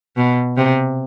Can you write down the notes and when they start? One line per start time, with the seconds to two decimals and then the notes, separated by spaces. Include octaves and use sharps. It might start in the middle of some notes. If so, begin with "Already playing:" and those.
0.17 B2
0.57 C3